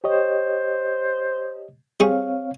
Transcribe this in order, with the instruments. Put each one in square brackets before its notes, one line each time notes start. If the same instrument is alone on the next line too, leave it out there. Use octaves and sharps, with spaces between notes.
[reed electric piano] G4 C#5 D#5 [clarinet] C5
[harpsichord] G3 G#4 C#6 [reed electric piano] C4 C#5 F5